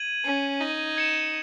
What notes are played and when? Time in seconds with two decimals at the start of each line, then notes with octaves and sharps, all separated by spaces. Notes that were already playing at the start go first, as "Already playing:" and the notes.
Already playing: G#6 D#7 F#7
0.25 C#4
0.61 D#4
0.97 G#6 C#7 E7